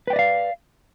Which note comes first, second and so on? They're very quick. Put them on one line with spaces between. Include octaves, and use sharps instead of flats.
B4 G5 D5 D#5 F5